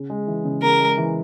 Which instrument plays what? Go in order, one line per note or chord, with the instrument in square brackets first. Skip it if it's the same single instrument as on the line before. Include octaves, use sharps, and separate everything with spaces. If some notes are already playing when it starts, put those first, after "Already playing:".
Already playing: [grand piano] C#3
G#3
E3
C#3
[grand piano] C#3 [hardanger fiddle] A#4
[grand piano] G#3
E3